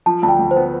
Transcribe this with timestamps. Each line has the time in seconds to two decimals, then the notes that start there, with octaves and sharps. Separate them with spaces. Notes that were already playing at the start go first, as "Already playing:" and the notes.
0.06 F3 A5
0.23 D2 A5
0.29 G5
0.39 D2
0.51 C5
0.56 B3